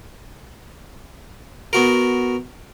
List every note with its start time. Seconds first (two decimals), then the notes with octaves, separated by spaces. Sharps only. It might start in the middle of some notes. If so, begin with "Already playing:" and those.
1.73 B3 F#4 A#4